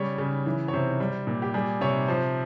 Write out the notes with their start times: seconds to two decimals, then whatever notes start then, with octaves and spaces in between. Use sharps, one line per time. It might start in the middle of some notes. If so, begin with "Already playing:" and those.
Already playing: C#3 G3 C#5
0.18 C#3
0.46 E3
0.68 C#5
0.73 C3 C5
1.00 G3
1.27 A#2
1.42 G4
1.54 G3 G#4
1.81 C3 C#5
2.08 F3 C5